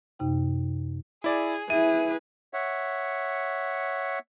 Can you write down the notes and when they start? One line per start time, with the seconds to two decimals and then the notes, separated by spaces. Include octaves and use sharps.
0.19 F#2 C3 D#4 G5
1.24 E4 G#4 D5
1.70 E4 G#4 B4 E5 D#7
2.54 C#5 E5 F#5